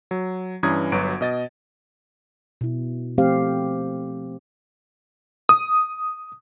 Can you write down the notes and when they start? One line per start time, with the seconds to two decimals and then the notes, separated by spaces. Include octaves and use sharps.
0.11 F#3
0.63 G2 E3 C#4 A#5 D#6 G#6
0.92 G1 F#3 F#4 B4 D7
1.21 B2 D#5 A6
2.61 B2 E4
3.18 F3 A3 C4 G4 C5 F5
5.49 D#6